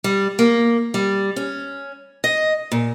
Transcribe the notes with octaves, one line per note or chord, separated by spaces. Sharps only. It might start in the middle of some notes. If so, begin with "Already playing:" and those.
G3
A#3
G3
C#4
D#5
A#2